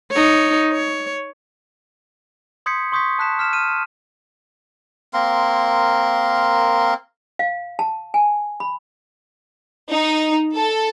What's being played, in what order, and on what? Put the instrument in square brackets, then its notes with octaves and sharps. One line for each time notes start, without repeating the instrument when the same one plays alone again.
[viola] D#4 C#5
C#5
[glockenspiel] C6 D#6 G6 G#6 B6 C#7
C6 C#6 D#6 G6 G#6 B6
A5 F#6 B6 E7
F6 B6 E7
F6 B6 D#7
[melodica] A#3 C4 A#4 C6
[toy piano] F5
A5
G#5
B5
[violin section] D#4
A4